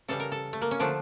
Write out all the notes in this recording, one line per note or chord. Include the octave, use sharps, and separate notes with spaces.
C#3 E3 G3 A4
A#4
A4
A3
A#3
C#4
D3 F3 A3 D4